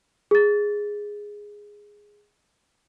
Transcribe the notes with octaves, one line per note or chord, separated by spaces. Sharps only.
G#4 A6